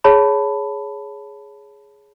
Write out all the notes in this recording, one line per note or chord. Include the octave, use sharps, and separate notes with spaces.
G#4 C#5 A5 B5